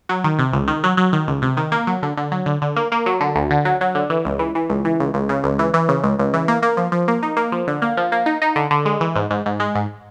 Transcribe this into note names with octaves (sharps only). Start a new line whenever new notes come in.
F#3
D#3
C3
C#2
D#3
F#3
F#3
D#3
C#2
C3
D#3
A#3
F#3
D3
D3
F#3
D3
D3
A#3
A#3
F#3
D3
D2
D3
F#3
F#3
D3
E3
C#2
E3
E3
C#2
E3
C#2
C#2
C#3
C#2
E3
E3
C#3
C#2
C#2
E3
A#3
A#3
F3
F3
A#3
D#4
A#3
F3
D3
A#3
F3
A#3
D#4
D#4
D3
D3
G#3
E3
G#2
G#2
G#2
G#3
G#2